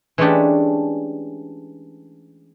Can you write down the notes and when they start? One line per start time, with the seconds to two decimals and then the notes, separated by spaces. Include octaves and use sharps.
0.18 E3 G#3 A3 C#4 D4 G4